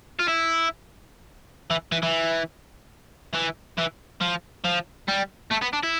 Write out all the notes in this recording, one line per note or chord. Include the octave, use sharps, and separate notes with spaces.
F4
E4
E3
E3
E3
E3
E3
F3
F3
G3
A3
B3
D4
E4